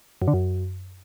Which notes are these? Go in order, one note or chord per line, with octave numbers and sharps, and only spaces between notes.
F#2
D3
F#2